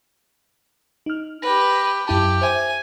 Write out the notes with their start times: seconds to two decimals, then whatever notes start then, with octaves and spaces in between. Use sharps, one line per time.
1.06 D#4 F6
1.42 G4 B4 A#6
2.07 F#2 E4 G4 A5
2.42 C5 E5 G#5